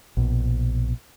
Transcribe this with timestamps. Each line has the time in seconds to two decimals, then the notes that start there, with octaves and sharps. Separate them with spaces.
0.17 A#1 B2